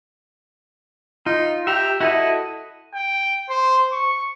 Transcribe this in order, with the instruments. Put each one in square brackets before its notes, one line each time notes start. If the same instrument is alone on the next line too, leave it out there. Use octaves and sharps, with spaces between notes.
[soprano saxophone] D#4 [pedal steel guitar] F4
[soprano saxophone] G4 [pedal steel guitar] E5 A#5
[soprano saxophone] E4 [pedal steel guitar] F#4 A4 D#5
[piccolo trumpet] G5
C5
C#6